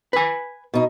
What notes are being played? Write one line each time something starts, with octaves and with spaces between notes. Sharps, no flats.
B4 G#5
B2 D#4